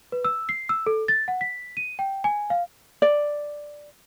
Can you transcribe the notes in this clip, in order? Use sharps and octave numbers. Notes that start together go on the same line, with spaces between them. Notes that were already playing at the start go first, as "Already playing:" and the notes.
B4
E6
C7
E6
A4
A6
F#5
B6
D#7
G5
G#5
F5
D5